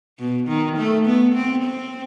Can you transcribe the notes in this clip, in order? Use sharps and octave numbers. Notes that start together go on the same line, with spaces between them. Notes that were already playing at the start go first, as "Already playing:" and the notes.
B2
D#3
A3
B3
C4
C4